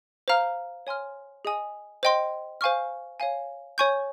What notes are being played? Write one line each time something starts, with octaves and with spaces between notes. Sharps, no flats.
C5 F5 A#5 F6
C#5 G#5 C6 F6
G#4 D#5 G#5 D#6
C5 D#5 G5 C6
C5 F5 G#5 C#6 F6
C#5 F5 G#5
C#5 G#5 C#6 G6